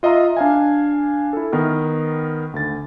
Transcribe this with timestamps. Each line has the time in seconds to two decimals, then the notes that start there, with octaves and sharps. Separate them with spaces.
0.03 F4 D#5 E5 A#5 C6
0.37 D4 F5 G#5
1.33 E4 A4
1.52 D#3 B3 A#4 F6
2.54 D2 A6